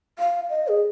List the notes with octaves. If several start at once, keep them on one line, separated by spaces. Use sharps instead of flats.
F5
D#5
G#4